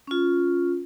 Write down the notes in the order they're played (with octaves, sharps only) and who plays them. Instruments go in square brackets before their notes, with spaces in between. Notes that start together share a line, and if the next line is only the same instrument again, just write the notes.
[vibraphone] C#4 F4